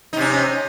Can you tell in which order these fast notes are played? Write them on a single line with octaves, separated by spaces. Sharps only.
D#4 C3 C#4